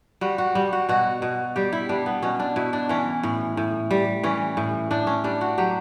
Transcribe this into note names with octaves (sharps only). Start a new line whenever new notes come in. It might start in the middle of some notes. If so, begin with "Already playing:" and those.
G3 F#4
F#4
G3
F#4
B2 F#4
B2
G3 G4
E4
G3 D4
B3
B2 C#4
D4
B2 E4
D4
E3 C#4
A2
A2
G3
E3 C#4
A2
A2 D4
C#4
G3 D4
F#4
F#3 G4